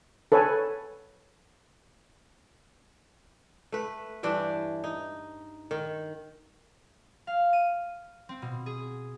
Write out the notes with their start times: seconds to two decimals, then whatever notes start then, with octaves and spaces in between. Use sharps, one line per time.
0.32 A4 B4 C#5 G#5
3.72 A3 B4
4.23 G2 E3 D4 G5
4.84 D#4
5.71 D#3
7.27 F5
7.53 D#7
8.29 C4
8.42 B2
8.66 G#4